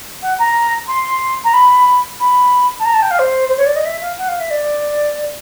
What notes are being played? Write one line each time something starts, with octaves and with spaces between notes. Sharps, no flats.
F#5
A#5
C6
A#5
B5
B5
A5
A#5
A5
G5
F5
C5
C5
C#5
D5
D#5
E5
F5
F#5
F5
E5
D5